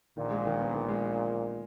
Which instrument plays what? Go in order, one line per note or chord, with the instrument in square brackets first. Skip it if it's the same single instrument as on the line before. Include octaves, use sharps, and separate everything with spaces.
[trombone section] A#1 A#2 [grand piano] D#3
[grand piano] G#3
D#3
B3
D#3
G#3